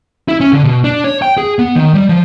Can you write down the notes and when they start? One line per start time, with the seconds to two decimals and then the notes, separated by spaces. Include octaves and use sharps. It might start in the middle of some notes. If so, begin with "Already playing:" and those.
0.29 E4
0.40 C#4
0.53 D3
0.64 B2
0.84 D4
1.04 C#5
1.22 G5
1.38 G#4
1.59 B3
1.75 D#3
1.94 G3
2.09 F3